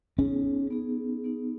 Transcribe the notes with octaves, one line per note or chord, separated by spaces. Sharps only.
B3 C#4 D#4 G#4
B3 D#4 G#4
B3 D#4 G#4